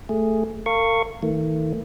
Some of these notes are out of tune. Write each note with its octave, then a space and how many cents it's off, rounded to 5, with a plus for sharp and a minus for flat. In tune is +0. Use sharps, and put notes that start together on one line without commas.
A3 +0 G#4 +0
A#4 -45 F5 -20 C#6 +0
D#3 +40 A3 +35